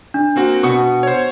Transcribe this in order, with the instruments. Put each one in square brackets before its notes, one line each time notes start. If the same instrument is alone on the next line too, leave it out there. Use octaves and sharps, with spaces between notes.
[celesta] D4
[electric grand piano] A#3 C4 F#4
[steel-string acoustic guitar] B2 [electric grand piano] C#6 D#6 C#7
[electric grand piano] C5 C#5